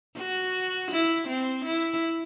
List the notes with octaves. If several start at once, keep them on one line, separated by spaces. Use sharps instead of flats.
F#4
E4
C4
E4